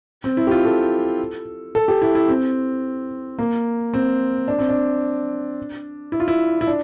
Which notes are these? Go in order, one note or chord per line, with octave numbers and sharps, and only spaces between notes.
C4
E4
G4
F4
A4
A4
G4
E4
E4
C4
A#3
C4
D4
C4
D4
E4
F4
E4
E4
D4